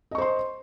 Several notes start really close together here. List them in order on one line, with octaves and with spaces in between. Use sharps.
D#5 C#6 C5 C6